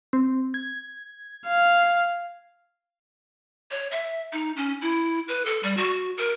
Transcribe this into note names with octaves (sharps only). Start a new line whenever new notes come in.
C4
G#6
F5
C#5
E5
D#4
C#4
E4
B4
A4
G3
F#4
A#4